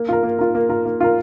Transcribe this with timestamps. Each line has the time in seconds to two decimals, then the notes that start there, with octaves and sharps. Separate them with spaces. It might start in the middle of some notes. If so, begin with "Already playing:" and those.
Already playing: A#3
0.08 F4 A#4
0.23 A#3
0.38 F4 A#4
0.55 A#3
0.69 F4 A#4
0.85 A#3
1.00 F4 A#4